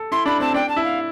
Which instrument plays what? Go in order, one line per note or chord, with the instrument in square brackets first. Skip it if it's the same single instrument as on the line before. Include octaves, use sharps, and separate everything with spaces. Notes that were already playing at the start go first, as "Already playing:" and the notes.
Already playing: [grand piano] A4
[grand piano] E4 [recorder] C6
[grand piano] D4 [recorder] B5
[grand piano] C4 [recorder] A5
[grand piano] D4 [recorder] G5
[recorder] A5
[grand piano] E4
[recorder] F5